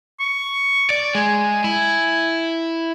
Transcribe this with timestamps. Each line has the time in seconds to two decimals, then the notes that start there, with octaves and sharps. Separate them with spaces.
0.20 C#6
0.90 D5
1.15 G#3 G#5
1.64 E4